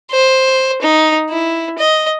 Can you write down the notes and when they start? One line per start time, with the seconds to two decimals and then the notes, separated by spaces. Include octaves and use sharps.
0.11 C5
0.82 D#4
1.30 E4
1.78 D#5